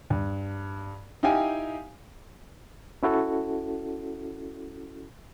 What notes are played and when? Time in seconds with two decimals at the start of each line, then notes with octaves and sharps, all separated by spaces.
0.10 G2
1.23 D#4 E4 G4 F5 G5 G#5
3.03 C#4 E4 F#4 A4